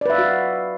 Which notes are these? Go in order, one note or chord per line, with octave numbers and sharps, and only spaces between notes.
F#4 B4 D5 E5 F5